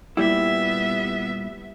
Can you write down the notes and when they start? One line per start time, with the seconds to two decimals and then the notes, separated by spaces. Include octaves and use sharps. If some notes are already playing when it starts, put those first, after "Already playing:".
0.17 A#2 G3 B3 E4 E5